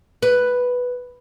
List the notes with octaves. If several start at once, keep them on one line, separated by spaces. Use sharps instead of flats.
B4